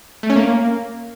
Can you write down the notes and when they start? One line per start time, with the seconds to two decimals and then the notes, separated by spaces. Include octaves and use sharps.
0.23 A3
0.30 C#4
0.36 A#3